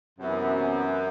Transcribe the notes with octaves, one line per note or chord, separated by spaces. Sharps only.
F#2 C3 E3 B3 E4